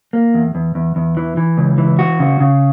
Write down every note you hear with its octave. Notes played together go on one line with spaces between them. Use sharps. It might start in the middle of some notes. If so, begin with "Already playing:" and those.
A#3
E2
E2
E2
E2
E3
E3
C#2
E3
F#4
C#3
C#3